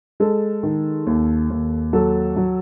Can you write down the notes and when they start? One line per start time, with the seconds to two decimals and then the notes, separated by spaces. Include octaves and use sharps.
0.20 G#3 A4
0.63 D#3
1.06 D#2
1.50 D#2
1.93 F#3 A4
2.36 F#3